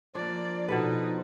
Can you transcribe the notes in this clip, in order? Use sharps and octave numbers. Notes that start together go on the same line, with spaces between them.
F3 A#3 D4 F4 D5
B2 D#4 A4 B4